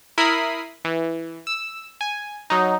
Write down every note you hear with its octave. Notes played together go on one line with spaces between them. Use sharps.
E4 A#4 B5 D#6 C7
E3
E6
G#5
F#3 D#4